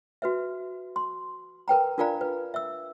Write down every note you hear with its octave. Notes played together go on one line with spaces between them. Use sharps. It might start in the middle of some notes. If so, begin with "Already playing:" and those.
F#4 B4 E5
C6
A#4 B4 G5 A#5
D4 F4 A#4 D5 F5 A#5
B4
E5 E6